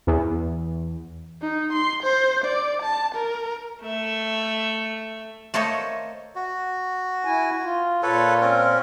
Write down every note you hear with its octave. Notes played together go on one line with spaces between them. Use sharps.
E2
D#4
C6
C5
D5
A5
A#4
A3 E5
A3 A#3 A4 C5 C#5 D#5
F#4
E4 G#5
F4
A#2 F4 A4 B4 C#5
C4 C#4 A#4